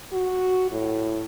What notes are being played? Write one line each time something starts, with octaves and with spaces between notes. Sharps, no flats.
F#4
A2